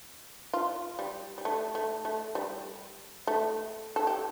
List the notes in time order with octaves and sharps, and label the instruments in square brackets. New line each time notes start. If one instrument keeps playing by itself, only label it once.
[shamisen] F4
G3
G3
A3
A3
A3
G3
A3
A4
G4